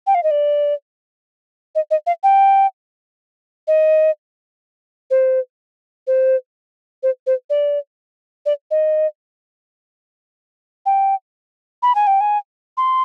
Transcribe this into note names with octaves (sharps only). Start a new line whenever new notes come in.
G5
F5
D#5
D5
D#5
D#5
F5
G5
D#5
C5
C5
C5
C5
D5
D5
D#5
G5
B5
G#5
G5
G#5
C6